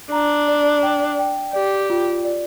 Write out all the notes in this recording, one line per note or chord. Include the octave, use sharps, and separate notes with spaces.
D4 A#5
D5
G5
G5
G4 D5
F4
D5